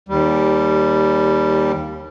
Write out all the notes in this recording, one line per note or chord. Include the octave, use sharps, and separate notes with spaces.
D#2 G3